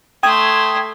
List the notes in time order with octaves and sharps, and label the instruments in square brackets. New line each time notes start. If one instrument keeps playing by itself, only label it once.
[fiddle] A3 C6 [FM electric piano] G5 D#6 G#6